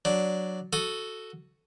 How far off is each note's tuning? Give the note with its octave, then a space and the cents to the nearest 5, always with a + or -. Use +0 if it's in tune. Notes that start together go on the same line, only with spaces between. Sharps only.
F#3 +0 D4 +0
F#4 +0 A4 +0 D#6 +0